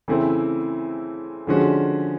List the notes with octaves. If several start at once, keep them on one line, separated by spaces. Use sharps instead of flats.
C#3 E3 A3 C4 E4
D3 F3 G#3 C#4 F#4